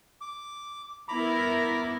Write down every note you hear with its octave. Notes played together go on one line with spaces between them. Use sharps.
D6
B3 E4 A#4 A#5 B5 D6